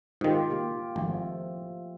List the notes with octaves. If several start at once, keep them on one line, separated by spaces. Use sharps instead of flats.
G#2 D#3 F4 G4
A#3 G4
G#1 F3 A3